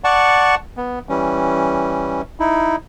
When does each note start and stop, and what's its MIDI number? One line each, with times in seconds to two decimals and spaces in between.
0.04 0.55 74
0.04 0.55 78
0.04 0.55 81
0.04 0.55 85
0.77 0.99 59
1.09 2.21 52
1.09 2.21 55
1.09 2.21 61
2.40 2.76 63
2.40 2.76 64